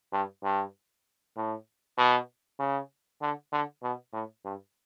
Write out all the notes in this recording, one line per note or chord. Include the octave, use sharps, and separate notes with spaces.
G2
G2
A2
B2
C#3
D3
D3
B2
A2
G2